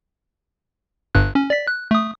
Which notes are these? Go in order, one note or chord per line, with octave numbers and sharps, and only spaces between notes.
G1 G2 F#6
C#4
D5 B6
F#6
A3 D#6